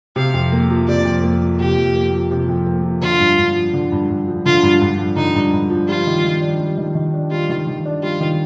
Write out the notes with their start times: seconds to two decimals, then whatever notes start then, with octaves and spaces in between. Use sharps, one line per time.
0.16 C3 F5
0.34 F2
0.52 A#3
0.70 F3
0.88 C3 D5
1.05 F2
1.23 A#3
1.41 F3
1.60 C3 G4
1.77 F2
1.95 A#3
2.13 F3
2.31 C3
2.48 F2
2.67 A#3
2.84 F3
3.02 D3 F4
3.20 G2
3.38 G2
3.56 F3
3.73 D3
3.92 G2
4.10 G2
4.28 F3
4.45 D3 F4
4.63 G2
4.81 G2
4.99 F3
5.16 D3 D#4
5.35 G2
5.53 G2
5.70 F3
5.88 G3 F4
6.07 D#3
6.24 D#3
6.42 D4
6.60 G3
6.78 D#3
6.95 D#3
7.14 D4
7.31 G3 F4
7.49 D#3
7.67 D#3
7.85 D4
8.03 G3 F4
8.20 D#3